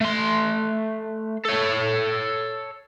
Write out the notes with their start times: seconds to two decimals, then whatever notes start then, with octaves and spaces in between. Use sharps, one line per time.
0.01 A3 C6
1.45 A4 C#5